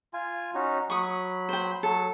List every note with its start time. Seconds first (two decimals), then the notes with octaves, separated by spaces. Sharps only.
0.14 F4 G#5
0.55 C#4 D#4 F#4
0.90 F#3 B5 C#6 D#6
1.49 C5 G5
1.83 F#3 A4